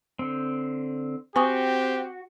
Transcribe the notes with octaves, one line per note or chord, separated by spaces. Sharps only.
D3 C4
C4 F#4 G4 G#5 C#6 D#6